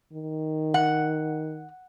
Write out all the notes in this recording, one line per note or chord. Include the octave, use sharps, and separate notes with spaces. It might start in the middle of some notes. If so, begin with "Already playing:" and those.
D#3
F#5